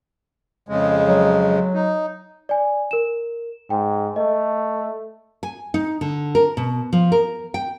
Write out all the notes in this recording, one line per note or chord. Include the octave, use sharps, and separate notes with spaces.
F2 C#3 G#3
F#3
D#4
D5 G#5
A#4 E7
G#2 G5
A3 D#5
G#5
D#4
D3
A#4
B2
F3
A#4
G5